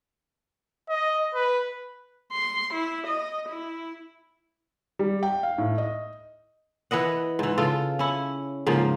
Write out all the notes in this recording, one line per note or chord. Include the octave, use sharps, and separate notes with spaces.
D#5
B4
C6
E4
D#5
E4
G3
G5
F5
A2
D#5
E3 B4 D#5 F#5
G#2 E3
C#3 F4 A4
C#4 E4
G#2 C#3 F3 A#3